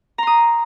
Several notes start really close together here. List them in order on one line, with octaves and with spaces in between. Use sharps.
A#5 C6 D#6